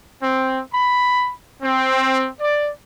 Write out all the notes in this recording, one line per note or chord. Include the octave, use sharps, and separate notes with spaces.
C4
B5
C4
D5